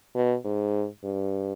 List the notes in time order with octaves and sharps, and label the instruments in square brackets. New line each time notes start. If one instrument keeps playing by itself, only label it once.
[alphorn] B2
G#2
G2